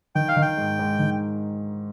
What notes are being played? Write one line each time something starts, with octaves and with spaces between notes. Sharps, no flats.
D#3 G5
F5
D#3
G5
G#2
G#2
D#3